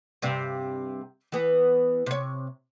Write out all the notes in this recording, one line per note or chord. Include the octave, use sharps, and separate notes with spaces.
G2 C3
E3 B3
C3 C#5